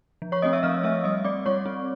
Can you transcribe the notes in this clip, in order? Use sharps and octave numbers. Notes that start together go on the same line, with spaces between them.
F3
C#5 C#6
A3 C4 D#5 D#6
E5 E6
F3 F5 F6
A3 C4 E5 E6
G3 D#5 D#6
C4 D5 D6
G3 C#5 C#6
C4